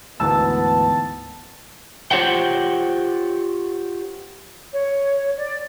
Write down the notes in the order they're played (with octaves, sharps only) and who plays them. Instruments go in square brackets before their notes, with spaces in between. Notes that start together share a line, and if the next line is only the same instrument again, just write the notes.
[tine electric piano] D2 G#2 E3 [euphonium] B3 [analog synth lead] A5 [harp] E6
[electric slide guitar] F4 G4 C5 C#5 F#5 G5
[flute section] C#5
D5